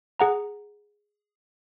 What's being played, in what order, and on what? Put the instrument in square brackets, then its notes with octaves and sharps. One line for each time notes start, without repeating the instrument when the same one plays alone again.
[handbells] G#4 F#5 A#5